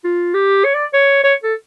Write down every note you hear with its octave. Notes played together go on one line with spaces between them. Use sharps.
F4
G4
C#5
D5
C#5
C#5
A4